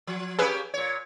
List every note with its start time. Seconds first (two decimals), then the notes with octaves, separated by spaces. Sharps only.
0.07 F3
0.39 A#3 C#4 G4 G#4 B4 E6
0.74 A#2 C#5